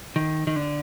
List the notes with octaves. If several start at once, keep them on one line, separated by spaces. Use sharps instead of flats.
D#3
D#3
D3